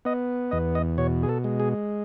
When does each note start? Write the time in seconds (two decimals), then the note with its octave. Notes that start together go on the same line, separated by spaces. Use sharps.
0.05 B3 D#5
0.51 E2 D#5
0.75 D#5
0.98 B2 C#5
1.23 G#4
1.29 A4
1.44 G#3
1.60 G#4